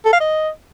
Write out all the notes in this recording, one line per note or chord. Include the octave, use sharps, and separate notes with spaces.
A4
F5
D#5